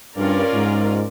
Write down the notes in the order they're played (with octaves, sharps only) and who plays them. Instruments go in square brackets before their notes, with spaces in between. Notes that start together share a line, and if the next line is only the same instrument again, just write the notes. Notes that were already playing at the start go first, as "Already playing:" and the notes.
[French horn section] G2 [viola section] C#4 F4 A#4 D5
[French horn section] G#2